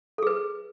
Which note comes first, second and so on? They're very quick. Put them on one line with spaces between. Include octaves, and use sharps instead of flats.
A4 G#4 B4